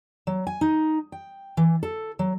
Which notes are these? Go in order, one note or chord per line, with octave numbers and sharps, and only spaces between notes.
F#3
G#5
D#4
G5
E3
A4
F#3